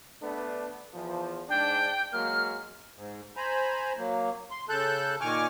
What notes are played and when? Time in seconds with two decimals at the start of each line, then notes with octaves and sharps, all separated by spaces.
0.22 A3 B3 D4
0.94 E2 F3
1.49 G#2 D4 G5
2.13 F#3 G#3 A#3 F6
2.96 G#2
3.37 C5 G#5 A#5 B5
3.97 F#3 A#3
4.51 C6
4.69 C#3 A4 A5 F#6 G6
5.21 A#2 D#3 G#5 C#6 D6 F6